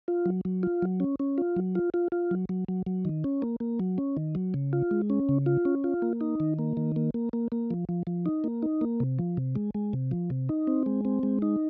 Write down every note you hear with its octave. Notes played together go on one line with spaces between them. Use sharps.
F4
F#3
F#3
F4
F#3
C#4
C#4
F4
F#3
F4
F4
F4
F#3
F#3
F#3
F#3
D#3
C#4
A#3
A#3
F#3
C#4
D#3
F#3
C#3
F4
G#3
C#4
C#3
F4
C#4
F4
A#3
D#4
D#3
A#3
D#3
A#3
A#3
A#3
A#3
F3
F3
F3
D#4
A#3
D#4
A#3
C3
F3
C3
G#3
G#3
C3
F3
C3
D#4
C4
G#3
C4
G#3
D#4